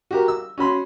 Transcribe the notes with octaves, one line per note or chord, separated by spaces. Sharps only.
F#4 G4 A#4
E6
C#4 F#4 B5 C6